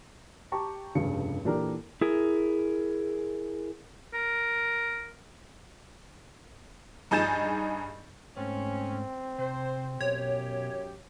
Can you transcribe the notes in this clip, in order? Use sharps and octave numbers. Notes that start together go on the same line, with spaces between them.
G4 G5 A5 A#5 C#6
F1 G2 C#3 G#4 C#7
A#2 E3 D4 G4 A4 A#4
E4 G#4 A#4
A#4
G2 D#4 G#4 G6 A6 E7
G#2 A3 C4 C#4
C3 C5
F#2 B2 G4 C#5